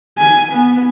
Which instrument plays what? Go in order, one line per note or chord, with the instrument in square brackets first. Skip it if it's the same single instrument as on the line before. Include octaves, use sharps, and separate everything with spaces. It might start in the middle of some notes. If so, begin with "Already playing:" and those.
[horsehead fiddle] G#5
B3